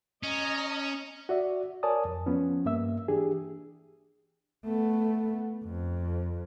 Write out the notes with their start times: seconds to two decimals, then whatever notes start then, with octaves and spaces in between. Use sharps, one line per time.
0.23 C#4 D#5 A#5
1.29 F#4 D5 E5
1.83 A#4 C#5 D5 G#5 A5 D#6
2.05 F2
2.26 F3 B3 C#4
2.66 G2 A#3 E5 E6
3.08 E3 D4 G4 G#4
4.65 A3 B3
5.64 F2